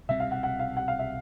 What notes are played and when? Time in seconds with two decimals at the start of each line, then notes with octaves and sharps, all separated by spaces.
0.09 C2 B2 G3 C4 E5
0.20 F5
0.31 F#5
0.43 F#5
0.59 F5
0.77 F#5
0.88 F5
0.99 E5